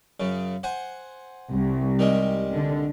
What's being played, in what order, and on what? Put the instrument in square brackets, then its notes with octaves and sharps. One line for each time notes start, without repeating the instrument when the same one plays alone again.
[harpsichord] F#2 C#3
C5 F#5 G#5
[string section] C2
[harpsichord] D#3 G3 G#3
[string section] D3